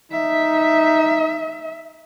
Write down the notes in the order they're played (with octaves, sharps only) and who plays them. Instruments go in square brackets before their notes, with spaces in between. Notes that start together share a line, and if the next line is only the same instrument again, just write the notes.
[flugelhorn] D#4 [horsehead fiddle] E5